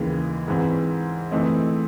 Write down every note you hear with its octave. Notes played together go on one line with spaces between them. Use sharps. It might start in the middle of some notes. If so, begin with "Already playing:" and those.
Already playing: D#2 C#3 E3 G#3
G#2 E3 C4
E3 A3 C4 D#4